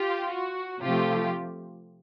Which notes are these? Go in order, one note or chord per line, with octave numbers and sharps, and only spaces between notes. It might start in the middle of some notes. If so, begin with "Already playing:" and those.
Already playing: F4 G4
F#4
C3 F3 A3 F4 G4